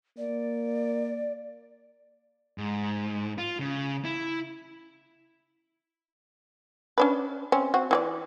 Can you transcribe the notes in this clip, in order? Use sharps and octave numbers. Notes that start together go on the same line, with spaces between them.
A#3 D5
G#2
F4
C#3
E4
C#4 D4 B4
C4 C#4
C4 F#4
E3 G#4 D5